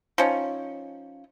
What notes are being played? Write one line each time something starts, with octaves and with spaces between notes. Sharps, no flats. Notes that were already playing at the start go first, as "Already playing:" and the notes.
F3 C#4 D#4